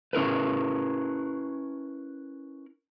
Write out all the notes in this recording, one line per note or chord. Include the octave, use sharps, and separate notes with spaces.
C#4 E4 A#4 B4